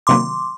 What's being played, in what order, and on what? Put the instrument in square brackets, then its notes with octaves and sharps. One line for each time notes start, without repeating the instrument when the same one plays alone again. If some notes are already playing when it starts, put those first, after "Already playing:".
[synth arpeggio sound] C3 D#3 F#3 A#3 [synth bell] C6 D6